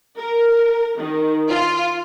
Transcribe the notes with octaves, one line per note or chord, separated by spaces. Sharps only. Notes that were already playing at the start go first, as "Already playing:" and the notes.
A#4
D#3
F4